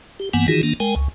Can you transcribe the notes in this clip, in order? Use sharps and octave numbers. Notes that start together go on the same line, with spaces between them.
G4
G2 E3 A#3 B3 F#5 G#5
D#3 E3 D#4 F4 F#4 G#4
D#3 A#3 D4
G#3 A#4 G5 G#5
C#2